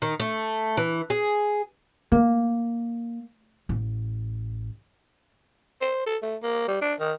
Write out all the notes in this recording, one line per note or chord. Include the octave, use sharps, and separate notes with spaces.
D#3
A3
E3
G#4
A#3
A1
C5
A4
A3
A#3
G3
D4
D#3